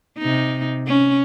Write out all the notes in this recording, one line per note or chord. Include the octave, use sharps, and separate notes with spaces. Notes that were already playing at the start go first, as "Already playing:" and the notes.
C3 D#4
C#4